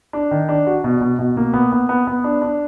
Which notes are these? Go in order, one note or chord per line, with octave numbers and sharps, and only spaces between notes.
D4
D#3
D4
F#4
B2
B2
B2
A#3
B3
B3
B3
B3
D4
D4